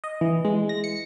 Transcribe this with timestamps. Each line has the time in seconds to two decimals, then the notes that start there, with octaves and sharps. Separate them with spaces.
0.04 D#5
0.21 E3
0.45 G#3
0.69 A#6
0.84 C#7